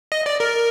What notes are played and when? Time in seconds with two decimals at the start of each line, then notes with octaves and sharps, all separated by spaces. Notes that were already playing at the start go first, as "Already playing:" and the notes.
0.12 D#5
0.26 D5
0.40 A#4